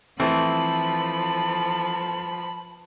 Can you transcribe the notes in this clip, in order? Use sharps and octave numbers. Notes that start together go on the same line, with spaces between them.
E3 F3 A3 C4 A5 B5